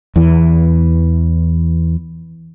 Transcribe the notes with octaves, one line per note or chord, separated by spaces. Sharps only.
E2 E3